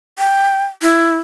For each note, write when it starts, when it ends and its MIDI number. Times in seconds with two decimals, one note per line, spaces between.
0.19 0.65 79
0.82 1.16 64